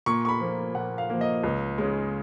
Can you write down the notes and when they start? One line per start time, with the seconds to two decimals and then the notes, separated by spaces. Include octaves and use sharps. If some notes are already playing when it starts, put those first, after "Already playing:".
0.06 A#2 C#6
0.25 C#6
0.29 B5
0.41 F3 A#3
0.75 A#2 F#5
0.98 F5
1.10 F3 A#3
1.21 D#5
1.43 C#2
1.78 C#3 G#3